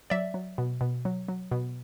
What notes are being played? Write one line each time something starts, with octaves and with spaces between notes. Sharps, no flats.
F#3 D5 E5
F#3
B2
B2
F#3
F#3
B2